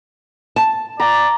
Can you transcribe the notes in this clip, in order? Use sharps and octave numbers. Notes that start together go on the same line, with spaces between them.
A5
D5 A#5